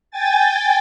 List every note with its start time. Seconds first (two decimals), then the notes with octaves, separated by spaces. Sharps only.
0.11 G5 G#5 A6